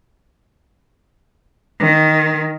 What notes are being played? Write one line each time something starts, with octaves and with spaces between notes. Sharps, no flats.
D#3